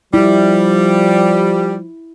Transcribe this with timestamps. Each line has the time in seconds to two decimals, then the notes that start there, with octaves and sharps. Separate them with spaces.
0.14 F3 G3 E4